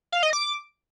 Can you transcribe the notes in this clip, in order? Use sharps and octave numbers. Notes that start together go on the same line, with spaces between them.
F5
D#5
D6